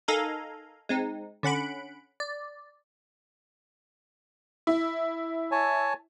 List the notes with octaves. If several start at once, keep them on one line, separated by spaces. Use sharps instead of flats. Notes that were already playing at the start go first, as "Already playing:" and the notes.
D#4 A4 A#4 F5 G#5 A#5
G#3 C4 D#4
D3 C#4 F#5 B5 D7
D5
E4
C#5 G#5 A5